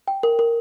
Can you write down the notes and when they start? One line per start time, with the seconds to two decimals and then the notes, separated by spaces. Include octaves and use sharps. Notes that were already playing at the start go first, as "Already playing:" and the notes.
0.08 G5
0.23 A#4
0.39 A#4